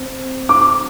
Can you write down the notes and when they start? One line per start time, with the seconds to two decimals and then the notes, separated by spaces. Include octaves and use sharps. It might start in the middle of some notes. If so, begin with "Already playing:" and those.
Already playing: C4
0.49 D6